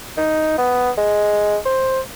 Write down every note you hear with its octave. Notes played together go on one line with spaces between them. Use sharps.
D#4
B3
G#3
C5